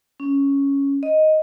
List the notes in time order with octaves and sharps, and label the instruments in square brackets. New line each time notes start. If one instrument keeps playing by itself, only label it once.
[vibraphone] C#4
D#5